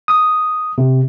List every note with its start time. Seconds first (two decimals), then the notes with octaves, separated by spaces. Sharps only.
0.08 D#6
0.78 C3